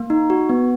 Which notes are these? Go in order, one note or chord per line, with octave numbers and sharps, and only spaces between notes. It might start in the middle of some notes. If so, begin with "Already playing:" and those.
Already playing: A#3
D#4
F#4
B3